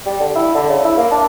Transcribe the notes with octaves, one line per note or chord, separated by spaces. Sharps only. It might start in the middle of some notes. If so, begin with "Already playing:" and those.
G3
D3
E4
D3
C#3
E4
A#3
D4